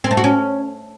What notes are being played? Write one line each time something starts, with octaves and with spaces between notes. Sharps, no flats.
C4
A3
F#4
C#4